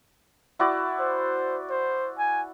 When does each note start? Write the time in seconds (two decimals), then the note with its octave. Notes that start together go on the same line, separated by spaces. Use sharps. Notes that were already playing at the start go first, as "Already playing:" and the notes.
0.59 E4 F#4 D5
1.00 C5
1.70 C5
2.18 G#5